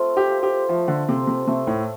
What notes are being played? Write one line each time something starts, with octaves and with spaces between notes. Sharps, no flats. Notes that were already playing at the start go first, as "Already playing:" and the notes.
Already playing: A3 C4 F4 C5
G4
C4 F4 C5
G4
F3 A3
D3
C3 F4 A4 C5
C3
C3 A3
A2